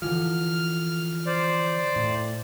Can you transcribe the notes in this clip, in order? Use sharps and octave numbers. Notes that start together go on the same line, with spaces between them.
D3 E3 F3 F6
C5 D5
A2